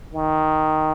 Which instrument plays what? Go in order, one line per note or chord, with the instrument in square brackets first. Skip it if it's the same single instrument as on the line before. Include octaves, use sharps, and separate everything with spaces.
[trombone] D#3